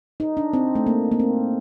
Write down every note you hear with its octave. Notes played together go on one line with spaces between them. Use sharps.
D#4
D4
C4
A3
A#3
A#3
C4